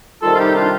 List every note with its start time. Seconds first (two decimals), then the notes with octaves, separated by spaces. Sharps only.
0.22 C3 D#3 G3 F4 A4
0.34 F4
0.39 D#4 G4
0.55 D4 F4